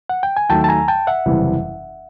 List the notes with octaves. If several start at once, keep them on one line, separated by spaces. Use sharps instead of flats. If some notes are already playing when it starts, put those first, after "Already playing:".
F#5
G5
G#5
D#2 D#3 F#3 A3 G5 A5
A5
G#5 A#5
G5 A5
E5 F#5
F#1 E2 C3 E3 G3